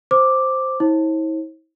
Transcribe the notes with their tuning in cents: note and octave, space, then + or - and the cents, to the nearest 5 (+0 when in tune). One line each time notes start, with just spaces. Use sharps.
C5 +0 D6 +0
E4 -40 C5 +45